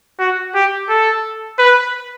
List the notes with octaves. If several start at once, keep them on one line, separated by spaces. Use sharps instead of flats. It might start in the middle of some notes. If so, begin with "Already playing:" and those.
F#4
G4
A4
B4